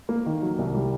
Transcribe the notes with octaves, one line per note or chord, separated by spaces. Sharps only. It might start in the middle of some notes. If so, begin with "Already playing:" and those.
A#3
D#3
F#3
C2
G3